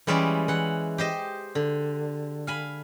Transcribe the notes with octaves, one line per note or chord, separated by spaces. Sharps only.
E3 G3 G#3 C#4 B4 D5
E3 F#5
G4 C5 D#5
D3
F5 G#5 B5